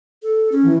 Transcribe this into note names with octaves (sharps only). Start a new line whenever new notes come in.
A4
C#4
E3